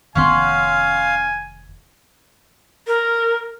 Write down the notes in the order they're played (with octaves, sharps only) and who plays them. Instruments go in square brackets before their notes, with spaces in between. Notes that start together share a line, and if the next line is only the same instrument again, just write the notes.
[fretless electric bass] F1 D#3 B3 [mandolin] C#4 F#5 C6 [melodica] F5 [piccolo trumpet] G#5
[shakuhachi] A#4